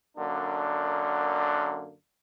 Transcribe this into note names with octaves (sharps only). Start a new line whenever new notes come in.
F#2 D3 A#3 D4